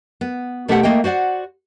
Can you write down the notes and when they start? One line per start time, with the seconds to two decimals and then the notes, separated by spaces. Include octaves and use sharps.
0.21 B3
0.68 B2 A3 G4 B4 D#5 F#5
0.83 A3 A#3 D#5 G5
1.04 F#4 C5 D5 F#5